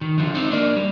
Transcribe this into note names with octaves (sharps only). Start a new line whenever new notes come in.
D#3
D3 F3
C4 D#4
A#3 D4
G3